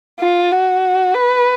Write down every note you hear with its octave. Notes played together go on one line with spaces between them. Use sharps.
F4
F#4
B4